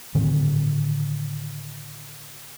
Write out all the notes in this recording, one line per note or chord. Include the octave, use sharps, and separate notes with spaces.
A2 D3 D#3 C4